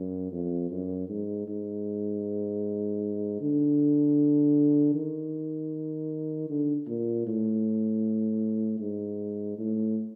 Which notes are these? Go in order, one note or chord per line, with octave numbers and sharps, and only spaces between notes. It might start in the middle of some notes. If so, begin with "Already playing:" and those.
Already playing: F#2
F2
F#2
G#2
G#2
D3
D#3
D3
A#2
A2
G#2
A2